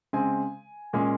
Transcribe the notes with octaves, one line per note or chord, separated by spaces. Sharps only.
C#3 G#3 C4 G#5
A#2 G#3 C#4